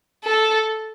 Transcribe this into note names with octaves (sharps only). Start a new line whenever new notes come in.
A4